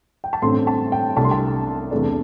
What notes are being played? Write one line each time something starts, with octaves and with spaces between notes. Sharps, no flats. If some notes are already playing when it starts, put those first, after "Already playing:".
G5
A5
A1 G2 D3 A3 C4 C6
A5
G5
C2 C3 A3 D4 A5
C6
A5
E2 C3 A3 D4